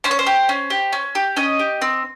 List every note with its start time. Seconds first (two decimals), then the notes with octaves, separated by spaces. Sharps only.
0.04 C#4 C5
0.11 C#5
0.19 C5
0.26 G4
0.49 C#4
0.70 G4
0.93 C#4
1.15 G4
1.37 C#4 D#5
1.59 G4
1.82 C4